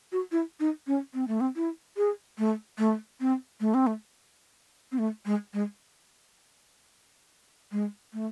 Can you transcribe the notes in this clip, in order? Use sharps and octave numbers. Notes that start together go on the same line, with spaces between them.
F#4
E4
D#4
C#4
C4
A3
C4
E4
G#4
A3
A3
C4
A3
C4
A3
C4
A3
G#3
G#3
G#3
A3